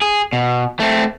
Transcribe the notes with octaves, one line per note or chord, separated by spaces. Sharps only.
G#4
B2
A3 C4